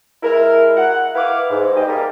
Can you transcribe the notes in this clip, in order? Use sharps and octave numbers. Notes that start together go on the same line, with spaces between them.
G#3 E4 A#4
F#5
E4 B4 F5 D6
G#2
G3 C4 G4 G#4 D#5
G3 A#3 A#4